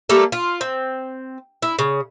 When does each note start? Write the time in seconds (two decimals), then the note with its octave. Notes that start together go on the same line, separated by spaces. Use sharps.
0.09 G3 A3 A#3 A4
0.32 F4
0.61 C4
1.62 E4
1.79 C#3